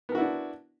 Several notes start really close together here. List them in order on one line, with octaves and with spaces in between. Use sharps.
B3 A#4 F#4 E4 D4